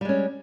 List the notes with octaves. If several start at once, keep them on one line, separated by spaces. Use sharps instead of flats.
G3 G#3 C#4